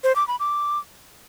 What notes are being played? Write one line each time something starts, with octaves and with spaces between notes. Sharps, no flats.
C5
D6
B5
D6